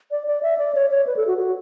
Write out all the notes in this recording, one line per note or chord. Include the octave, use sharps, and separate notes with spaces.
D5
D5
E5
D5
C#5
C#5
B4
A4
F#4
F#4